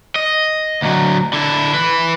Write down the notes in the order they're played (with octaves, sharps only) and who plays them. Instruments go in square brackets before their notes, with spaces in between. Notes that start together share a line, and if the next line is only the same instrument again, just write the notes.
[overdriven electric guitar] D#5
D2 F#3
D3 E4
E4 B4